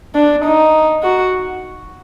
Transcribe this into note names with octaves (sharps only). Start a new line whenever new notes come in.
D4
D#4
F#4